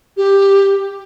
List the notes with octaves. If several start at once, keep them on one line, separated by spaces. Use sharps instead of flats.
G4